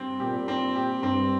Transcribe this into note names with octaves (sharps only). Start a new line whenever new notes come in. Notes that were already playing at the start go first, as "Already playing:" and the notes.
Already playing: G2 C4 G4
A#2 G4
C4
G4
G2 C4